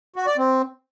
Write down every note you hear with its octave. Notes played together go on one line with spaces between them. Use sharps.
F#4
D5
C4